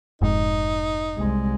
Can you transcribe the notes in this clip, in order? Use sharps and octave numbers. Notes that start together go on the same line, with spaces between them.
F1 G#2 D#4
C2 G#3